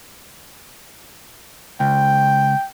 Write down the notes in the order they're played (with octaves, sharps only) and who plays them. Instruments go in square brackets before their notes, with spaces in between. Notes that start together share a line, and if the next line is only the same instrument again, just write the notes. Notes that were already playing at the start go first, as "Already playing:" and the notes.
[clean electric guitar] C#2 [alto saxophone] G5